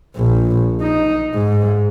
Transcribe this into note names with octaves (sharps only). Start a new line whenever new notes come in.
A#1
D#4
G#2